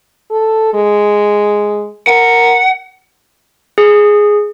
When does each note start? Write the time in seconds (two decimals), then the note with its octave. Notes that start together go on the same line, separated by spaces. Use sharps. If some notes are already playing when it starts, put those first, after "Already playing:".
0.31 A4
0.74 G#3
2.07 A#4 F#5
3.78 G#4